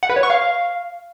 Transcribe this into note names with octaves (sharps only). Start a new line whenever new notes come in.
F#5
B4
C#5
C#6
F5